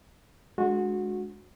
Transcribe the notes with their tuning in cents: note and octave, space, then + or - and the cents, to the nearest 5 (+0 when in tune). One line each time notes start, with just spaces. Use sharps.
G#3 +15 D4 +0 F#4 -20